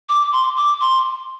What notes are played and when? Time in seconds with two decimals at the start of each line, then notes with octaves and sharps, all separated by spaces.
0.09 D6
0.33 C6
0.57 D6
0.81 C6